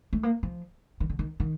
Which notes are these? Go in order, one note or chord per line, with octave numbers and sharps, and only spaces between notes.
A3
A#3
F3
D#3
D3
D#3
D#3